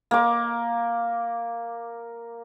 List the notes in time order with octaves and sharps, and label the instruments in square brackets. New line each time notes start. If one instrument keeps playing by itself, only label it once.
[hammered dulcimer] A#3 D6